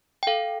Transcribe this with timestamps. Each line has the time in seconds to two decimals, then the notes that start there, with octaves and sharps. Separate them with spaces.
0.23 G5
0.27 A4 F5